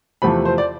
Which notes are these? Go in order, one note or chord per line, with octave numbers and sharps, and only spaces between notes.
E2 C3 F3 A3 B5
C5
D5